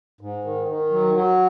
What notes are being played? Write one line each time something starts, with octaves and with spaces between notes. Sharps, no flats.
G#2
D#3
D#3
F#3
F#3